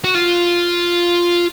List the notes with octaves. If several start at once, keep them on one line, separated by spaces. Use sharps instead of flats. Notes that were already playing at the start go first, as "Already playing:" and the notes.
F#4
F4